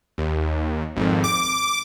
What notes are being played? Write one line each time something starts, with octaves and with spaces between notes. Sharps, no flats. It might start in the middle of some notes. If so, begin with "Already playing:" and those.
D#2
G#1 F2
D6